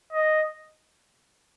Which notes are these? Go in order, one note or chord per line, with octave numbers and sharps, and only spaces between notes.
D#5